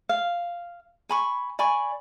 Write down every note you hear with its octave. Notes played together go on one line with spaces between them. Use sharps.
F5
G#5 B5 C#6
D5 G#5 B5 C#6